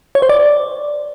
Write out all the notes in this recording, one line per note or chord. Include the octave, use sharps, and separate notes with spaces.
C#5
C5
D5